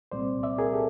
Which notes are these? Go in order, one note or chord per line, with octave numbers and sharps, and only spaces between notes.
C2 A#2 G3 C4 C5 D5
D5 E5
G#4 A#4
G4 A4